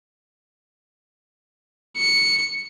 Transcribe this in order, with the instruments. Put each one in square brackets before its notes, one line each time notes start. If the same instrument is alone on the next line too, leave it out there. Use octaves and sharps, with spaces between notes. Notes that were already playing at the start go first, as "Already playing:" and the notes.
[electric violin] C#7